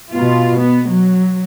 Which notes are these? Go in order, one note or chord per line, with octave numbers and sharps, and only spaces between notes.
B2 F4
B3
F#3